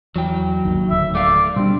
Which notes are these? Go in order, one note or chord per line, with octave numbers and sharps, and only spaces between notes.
E2 E3 F#3 G5
G#1 D#2 D#3
D1 D2 D#3 E5
A3 D5 F5
B2 G3 C4 D4